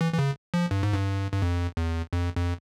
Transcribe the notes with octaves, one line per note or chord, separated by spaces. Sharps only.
E3
E3
C#3
F3
G2
G#2
G2
G2
F2
E2
F2
F2